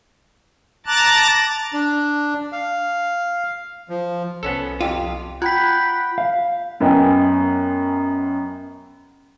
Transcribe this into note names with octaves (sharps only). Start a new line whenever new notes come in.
A5 A#5 D6 F#6 A6
D4
F5
F3
C2 B3 C#4 A4
F2 F4 G4
F4 F#5 G5 B5 F#6 B6
F5
F#2 B3 D#5 G5 G#5